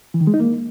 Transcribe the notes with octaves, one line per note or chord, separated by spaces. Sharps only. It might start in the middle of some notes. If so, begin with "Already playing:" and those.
E3
D#3
G#3
D#4
A#3